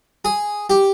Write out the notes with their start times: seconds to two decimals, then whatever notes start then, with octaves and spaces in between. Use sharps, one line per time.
0.25 G#4
0.70 G4